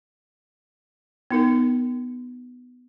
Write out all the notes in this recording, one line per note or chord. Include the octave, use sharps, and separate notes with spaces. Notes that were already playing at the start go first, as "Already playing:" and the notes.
B3 D#4 A#4